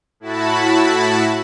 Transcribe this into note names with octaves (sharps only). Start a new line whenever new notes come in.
A2 E4 F#4 A5 B5